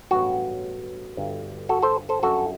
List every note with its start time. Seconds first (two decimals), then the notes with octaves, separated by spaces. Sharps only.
0.11 A1 G2 F#3 B3 F#4
1.17 G1 G2 D3
1.69 F#4 A4
1.83 A4 C5
2.09 A4 C5
2.23 G1 F#2 D3 F#4 A4